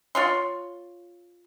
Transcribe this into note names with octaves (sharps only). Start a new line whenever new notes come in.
F4 C#5 C6